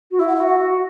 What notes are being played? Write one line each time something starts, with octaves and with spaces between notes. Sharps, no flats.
F#4
E4 E5
F#5
E5
F#4
F#5
F#4